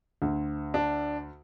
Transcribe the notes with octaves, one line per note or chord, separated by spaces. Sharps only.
D2
D4